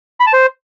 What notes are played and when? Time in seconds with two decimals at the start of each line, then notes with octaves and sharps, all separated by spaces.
0.20 B5
0.27 A5
0.33 C5